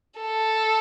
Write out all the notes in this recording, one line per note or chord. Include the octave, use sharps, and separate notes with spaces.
A4